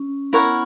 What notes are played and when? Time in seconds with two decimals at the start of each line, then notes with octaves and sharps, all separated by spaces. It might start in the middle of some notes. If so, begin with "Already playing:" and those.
Already playing: C#4
0.33 B3 E4 A#4 C#5 F#5
0.43 B3